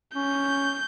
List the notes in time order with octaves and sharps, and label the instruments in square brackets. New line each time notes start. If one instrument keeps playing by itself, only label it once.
[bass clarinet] C#4 [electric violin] G6